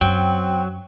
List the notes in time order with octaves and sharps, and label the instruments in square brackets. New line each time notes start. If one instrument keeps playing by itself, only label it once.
[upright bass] F#2 [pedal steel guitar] F#3 [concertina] C4 [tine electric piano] G5